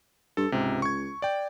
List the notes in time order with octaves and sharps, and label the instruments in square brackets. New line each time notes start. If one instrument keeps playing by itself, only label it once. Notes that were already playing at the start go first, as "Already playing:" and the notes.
[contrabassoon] G2 [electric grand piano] A4
[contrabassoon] C#2 [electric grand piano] G#2 C3
[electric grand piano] C#6 G#6
D5 G5